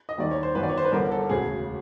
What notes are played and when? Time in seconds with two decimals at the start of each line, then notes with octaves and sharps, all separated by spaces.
0.09 D#5
0.18 D#2 D#3 G3 D5
0.31 C#5
0.43 C5
0.55 G1 F#2 D#3 F#3 B4
0.63 D5
0.70 C#5
0.78 C5
0.85 B4
0.92 G1 G2 D3 A#4
1.12 A4
1.30 E1 D2 C#3 G#4